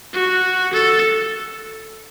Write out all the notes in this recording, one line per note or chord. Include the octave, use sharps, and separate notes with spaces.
F#4
A4